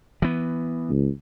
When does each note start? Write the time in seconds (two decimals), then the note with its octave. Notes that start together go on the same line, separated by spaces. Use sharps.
0.22 E3 B3
0.89 C#2